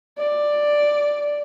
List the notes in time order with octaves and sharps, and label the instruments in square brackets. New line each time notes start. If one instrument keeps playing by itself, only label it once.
[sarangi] D5